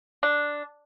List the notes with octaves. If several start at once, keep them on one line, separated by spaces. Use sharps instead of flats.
D4